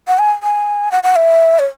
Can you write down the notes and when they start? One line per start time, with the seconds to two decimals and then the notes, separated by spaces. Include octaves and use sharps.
0.07 F#5
0.19 G#5
0.43 G#5
0.92 F#5
1.03 F#5
1.16 E5
1.59 C#5